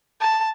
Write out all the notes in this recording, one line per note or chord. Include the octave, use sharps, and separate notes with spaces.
A5